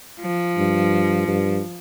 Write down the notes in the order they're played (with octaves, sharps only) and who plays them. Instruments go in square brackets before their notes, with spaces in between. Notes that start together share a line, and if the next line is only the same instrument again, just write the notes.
[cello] F3
[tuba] G2
G2